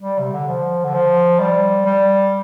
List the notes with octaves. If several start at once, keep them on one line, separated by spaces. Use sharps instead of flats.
G3
C3
D3
F3
D3
F3
G3
G3